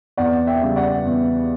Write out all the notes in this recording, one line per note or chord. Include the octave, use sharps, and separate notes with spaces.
E2 D5 F#5
E5 G5
C#3 G3
D5 F#5
E2